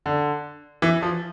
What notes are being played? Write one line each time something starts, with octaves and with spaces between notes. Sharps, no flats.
D3
E3
F3